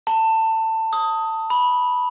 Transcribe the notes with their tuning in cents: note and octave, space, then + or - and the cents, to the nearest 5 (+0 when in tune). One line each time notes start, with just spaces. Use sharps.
A5 +20
D#6 +15
B5 -10